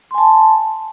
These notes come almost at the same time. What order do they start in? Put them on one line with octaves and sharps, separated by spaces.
C6 G#5 A5